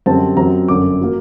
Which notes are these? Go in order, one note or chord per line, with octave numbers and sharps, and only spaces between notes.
F#2 D3 G3 C4 A5
F#2 F#3 C4 A#5
G1 F#2 D3 D6
F#3 A#3